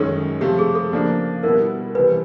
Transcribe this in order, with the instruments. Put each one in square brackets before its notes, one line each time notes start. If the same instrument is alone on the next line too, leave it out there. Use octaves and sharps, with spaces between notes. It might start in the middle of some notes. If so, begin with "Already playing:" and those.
Already playing: [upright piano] F#2 D#3 G#3 C#4 [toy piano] A4
[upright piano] C3 F3 A3 [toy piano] G4
[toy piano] G#4
A4
[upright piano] C#3 F3 A#3 D4
[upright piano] B2 G3 B3 E4 [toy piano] A#4
[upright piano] C2 C3 E3 [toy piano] B4